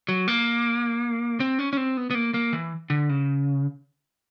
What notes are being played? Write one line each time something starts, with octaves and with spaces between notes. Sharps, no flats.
F#3
A#3
C4
C#4
C#4
C4
B3
B3
A#3
A#3
E3
D3
C#3